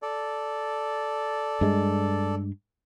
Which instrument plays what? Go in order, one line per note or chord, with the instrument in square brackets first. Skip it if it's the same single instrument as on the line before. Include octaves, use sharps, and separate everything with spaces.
[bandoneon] A4 D5
[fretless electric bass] G2 G#3